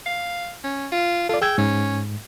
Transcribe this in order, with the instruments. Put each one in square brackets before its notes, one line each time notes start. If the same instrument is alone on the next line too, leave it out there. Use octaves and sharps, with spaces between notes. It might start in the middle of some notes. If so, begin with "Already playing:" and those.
[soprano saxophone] F5
C#4
F4
[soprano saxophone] F4 [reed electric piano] A4 D5
[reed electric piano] G#4 E6 G#6 [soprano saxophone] G5
[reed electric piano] G#2 [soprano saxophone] C#4